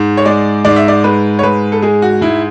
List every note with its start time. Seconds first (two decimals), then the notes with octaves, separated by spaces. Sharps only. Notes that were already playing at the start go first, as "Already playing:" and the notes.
Already playing: G#2
0.17 C#5
0.25 G#3 D5
0.65 G#2 D5
0.76 E5
0.88 D5
1.04 G#3 B4
1.39 C#5
1.43 G#2 B4
1.72 A4
1.82 G#3 G#4
2.02 F#4
2.21 G#2 E4